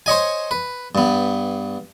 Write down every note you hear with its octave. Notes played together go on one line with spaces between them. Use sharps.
C5 C#5 D#5 G#5
B4
G2 B3